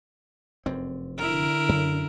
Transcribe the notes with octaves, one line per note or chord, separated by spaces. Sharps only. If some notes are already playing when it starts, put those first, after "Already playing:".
F1 F#2 C4
D3 E4 A#4
F#2